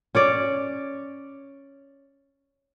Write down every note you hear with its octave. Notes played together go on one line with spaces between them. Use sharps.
C#4 C#5 D5